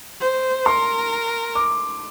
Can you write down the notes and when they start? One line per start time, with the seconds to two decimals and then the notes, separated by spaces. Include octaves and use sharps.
0.20 C5
0.65 A#4 C6
1.55 D6